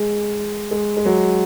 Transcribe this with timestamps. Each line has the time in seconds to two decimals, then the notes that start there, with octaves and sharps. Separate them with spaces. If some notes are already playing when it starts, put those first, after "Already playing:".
Already playing: G#3
0.71 G#3
0.97 G#3
1.05 F#3